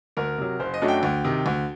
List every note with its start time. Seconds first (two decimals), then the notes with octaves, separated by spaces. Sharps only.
0.17 D2 A#4
0.38 C3 F#3
0.59 F#1 C5
0.74 D#5
0.82 F#2 F#3 A3 D4
0.88 G5
1.03 D2
1.24 C3 D#3
1.46 D2